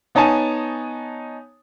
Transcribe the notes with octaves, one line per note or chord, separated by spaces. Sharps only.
B3 D#4 C#5 G#5 A5